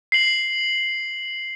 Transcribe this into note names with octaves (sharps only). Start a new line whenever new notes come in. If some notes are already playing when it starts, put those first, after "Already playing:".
C7 F#7